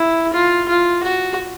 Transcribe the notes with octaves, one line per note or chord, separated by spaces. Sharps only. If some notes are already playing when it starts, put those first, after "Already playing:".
Already playing: E4
F4
F4
F#4